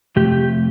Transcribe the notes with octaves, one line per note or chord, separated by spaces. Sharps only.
F2 C3 A3 G4